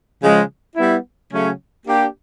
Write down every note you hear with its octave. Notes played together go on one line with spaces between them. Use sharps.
C#3 F3 G#3
G3 B3 E4
C#3 F#3 A3 C#4
A#3 D4 G4